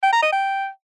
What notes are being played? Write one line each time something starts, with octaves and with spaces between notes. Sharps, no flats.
G5
A#5
D#5
G5